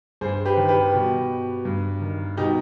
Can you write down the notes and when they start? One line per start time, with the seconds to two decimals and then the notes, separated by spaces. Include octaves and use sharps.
0.21 G2 G#4 C5
0.45 G4 B4
0.57 D#3
0.69 G4 B4
0.94 B2
1.65 G2
2.01 D#3
2.37 B2 D#4 G4